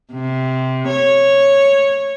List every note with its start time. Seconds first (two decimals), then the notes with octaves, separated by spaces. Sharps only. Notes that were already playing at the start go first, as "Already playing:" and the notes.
0.13 C3
0.88 C#5